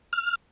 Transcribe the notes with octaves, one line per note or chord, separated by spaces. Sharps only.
F6